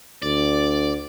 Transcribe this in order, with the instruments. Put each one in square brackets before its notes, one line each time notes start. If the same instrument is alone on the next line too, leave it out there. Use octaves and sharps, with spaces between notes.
[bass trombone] D2 [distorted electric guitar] D5